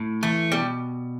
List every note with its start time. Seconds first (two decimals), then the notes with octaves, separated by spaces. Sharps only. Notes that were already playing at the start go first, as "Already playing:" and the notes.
Already playing: A2
0.23 E3 A3
0.52 B2 G3